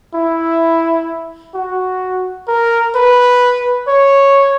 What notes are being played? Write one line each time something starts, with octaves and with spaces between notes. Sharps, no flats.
E4
F#4
A#4
B4
C#5